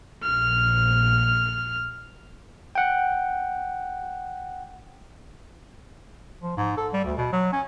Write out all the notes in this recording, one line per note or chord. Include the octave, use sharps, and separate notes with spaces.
A#1 F6
F#5 G5
F3
G#2
A4
G3
D2
B2
F#3
C#4